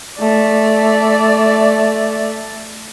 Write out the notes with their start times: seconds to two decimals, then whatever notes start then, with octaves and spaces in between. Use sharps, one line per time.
0.19 A3 D5